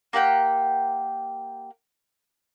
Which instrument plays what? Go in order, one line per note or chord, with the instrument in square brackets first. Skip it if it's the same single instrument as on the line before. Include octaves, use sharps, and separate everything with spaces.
[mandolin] A#3 G4 F#5 G5